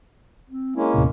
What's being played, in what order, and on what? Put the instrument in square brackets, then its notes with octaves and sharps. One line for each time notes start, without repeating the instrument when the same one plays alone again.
[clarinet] C4
[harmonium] G#3 A#3 C#4 [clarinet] E4
[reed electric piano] D#2 A2 C3